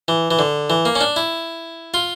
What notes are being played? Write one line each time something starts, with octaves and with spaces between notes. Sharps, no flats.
E3
E3
D3
E3
A#3
C#4
D4
E4
F4